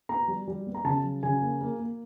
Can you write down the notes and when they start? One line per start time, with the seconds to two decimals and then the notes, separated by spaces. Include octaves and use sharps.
0.09 B3 A#5
0.28 G3
0.48 G3
0.67 B3
0.75 A#5
0.84 C#3 A5
1.04 F#3
1.23 C#3 G#5
1.41 A#3
1.61 A#3
1.79 A#3